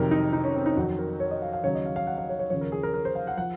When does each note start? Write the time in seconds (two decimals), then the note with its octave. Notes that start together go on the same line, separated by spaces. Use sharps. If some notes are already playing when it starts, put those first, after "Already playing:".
Already playing: F2 C3 D#3 F#3 A#4
0.11 D#4
0.33 D#4
0.44 C#4
0.55 C4
0.66 D#4
0.76 F2 D#3 F#3 F#4
0.99 A#4
1.20 C#5
1.31 D#5
1.42 F5
1.53 F5
1.63 D#2 C#3 F#3 C#5
1.75 D#5
1.86 F5
1.96 F5
2.07 F#5
2.18 F5
2.29 C#5
2.39 C#5
2.50 D#2 C#3 F3 C#5
2.61 A#4
2.72 G#4
2.83 A#4
2.94 A#4
3.05 C5
3.15 F5
3.27 F#5
3.38 F3 F#5